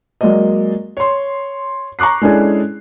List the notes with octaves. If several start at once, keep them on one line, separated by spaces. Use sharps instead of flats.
F#3 G#3 A#3 D5 D#5
C#5 C6
A#5 C#6 D6 F#6 C7
G#3 C#4 D4 E4 G#4 A4